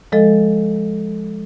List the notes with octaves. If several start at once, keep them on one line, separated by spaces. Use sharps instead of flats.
F3 G#3 A4 D#5